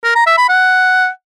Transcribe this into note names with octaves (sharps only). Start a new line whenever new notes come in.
A#4
A#5
E5
B5
F#5